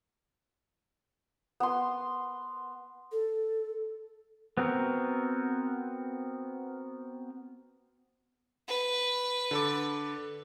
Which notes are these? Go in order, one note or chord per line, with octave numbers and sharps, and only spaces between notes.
B3 C6
A4
B3 C4 F#4 A#4
B4
D3 A4 D6